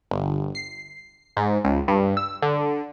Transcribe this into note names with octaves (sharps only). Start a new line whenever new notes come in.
G1
C7
G#2
C#2
G2
E6
D3